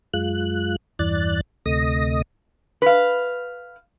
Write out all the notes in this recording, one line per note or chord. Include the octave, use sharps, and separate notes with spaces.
F#2 G#3 F4 F#6
E2 G2 E3 D5 F#6 A6
D2 C3 A3 D#5 D#6 A#6
B4 F5